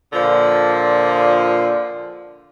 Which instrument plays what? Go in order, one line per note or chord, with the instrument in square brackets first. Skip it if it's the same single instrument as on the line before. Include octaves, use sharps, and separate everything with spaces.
[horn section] A#2 D3 F3